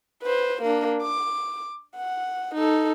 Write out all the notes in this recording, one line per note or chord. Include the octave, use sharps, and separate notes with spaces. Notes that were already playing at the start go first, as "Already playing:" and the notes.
B4 C5
A#3 D4
D6
F#5
D#4 A4